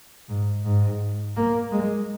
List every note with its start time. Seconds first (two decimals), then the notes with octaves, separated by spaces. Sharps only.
0.29 G#2
0.64 G#2
1.37 A#3
1.72 G#3